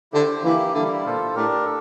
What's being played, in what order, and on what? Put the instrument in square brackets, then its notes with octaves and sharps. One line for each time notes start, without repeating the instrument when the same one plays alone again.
[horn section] D3 [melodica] E4 G4 C5
[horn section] E3 [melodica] A#3 E4 G4
[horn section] D3 [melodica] G3 A#3 E4
[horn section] A#2 [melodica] F4 A4 C5
[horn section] A2 [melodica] D4 G4 A#4
[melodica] A4